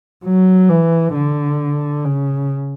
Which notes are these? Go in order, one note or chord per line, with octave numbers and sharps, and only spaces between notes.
F#3
E3
D3
C#3